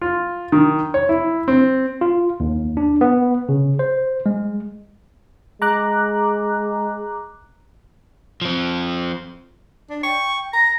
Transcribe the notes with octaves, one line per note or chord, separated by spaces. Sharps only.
F4
D#3
C#5
E4
C4
F4
D#2
D4
B3
C#3
C5
G#3
G#3 A#5 D6 F#6
F3 C4
D4
G5 C#6
A#5 A#6